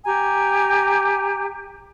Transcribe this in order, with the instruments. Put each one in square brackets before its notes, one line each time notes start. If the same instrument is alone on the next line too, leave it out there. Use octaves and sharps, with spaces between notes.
[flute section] G4 G#5 A#5